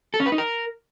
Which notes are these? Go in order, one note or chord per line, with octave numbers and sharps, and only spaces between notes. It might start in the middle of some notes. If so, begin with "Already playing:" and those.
A4
C#4
B4
D#4
A#4